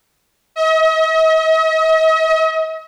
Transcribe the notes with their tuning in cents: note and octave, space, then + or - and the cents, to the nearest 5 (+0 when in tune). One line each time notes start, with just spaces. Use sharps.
D#5 +45